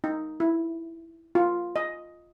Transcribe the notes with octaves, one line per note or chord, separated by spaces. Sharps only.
D#4
E4
F4
D#5